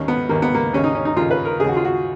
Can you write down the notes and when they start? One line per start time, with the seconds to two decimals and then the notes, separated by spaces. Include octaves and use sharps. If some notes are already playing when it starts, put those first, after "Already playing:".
Already playing: D#2 D#3 C#4
0.08 B3
0.29 D#2 D#3 A#3
0.42 B3
0.54 A#3
0.73 D#2 C#3 C#4
0.84 D#4
0.95 C#4
1.05 D#4
1.16 D#2 C#3 F4
1.31 B4
1.45 A#4
1.60 C#3 G#4
1.64 D#2 F#4
1.77 F4
1.85 F#4